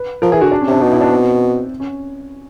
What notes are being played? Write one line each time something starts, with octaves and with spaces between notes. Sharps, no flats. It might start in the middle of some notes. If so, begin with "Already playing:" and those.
Already playing: B4
F3 A#4
E3 G#4
D3 F#4
D4
C#4
C3 D4
B2 D#4
E4
D4
C4
C#4